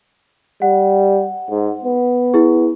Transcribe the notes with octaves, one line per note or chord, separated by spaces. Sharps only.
G3 F#5
G#2
B3
E4 G#4